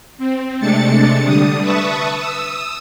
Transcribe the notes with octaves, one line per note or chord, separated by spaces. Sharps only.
C4
C3 G#3 A3 D4 A6 C#7
D3 G3 D#6
B4 E5 A5 C#6 D#6
D#6 E6